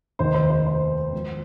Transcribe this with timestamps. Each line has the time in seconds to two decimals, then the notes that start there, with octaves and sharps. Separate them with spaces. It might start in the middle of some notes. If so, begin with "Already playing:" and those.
0.19 F1 D#2 D#3 C5
0.34 C5
0.50 C5
0.66 C5
1.12 G#1 G#2 F3